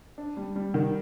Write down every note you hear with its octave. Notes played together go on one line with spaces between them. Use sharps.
D4
G3
G3
D#3 G3